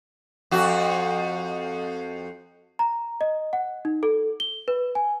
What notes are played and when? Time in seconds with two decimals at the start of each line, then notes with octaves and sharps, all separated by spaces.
0.51 F2 F#4
2.79 A#5
3.21 D#5
3.53 F#5
3.85 D#4
4.03 A4
4.40 G7
4.68 B4
4.95 G#5